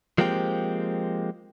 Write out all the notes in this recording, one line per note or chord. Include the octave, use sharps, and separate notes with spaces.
F3 G#3 A#3 C4 G4